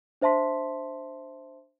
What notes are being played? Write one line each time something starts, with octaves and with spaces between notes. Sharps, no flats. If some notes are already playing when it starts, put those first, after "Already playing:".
D4 C5 E5 A5 C6 B6